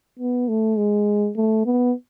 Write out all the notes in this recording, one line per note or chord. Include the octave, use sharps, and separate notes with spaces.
B3
A3
G#3
A3
B3